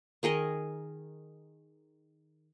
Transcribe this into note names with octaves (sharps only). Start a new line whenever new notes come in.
D#3 G#4 A#4 D#5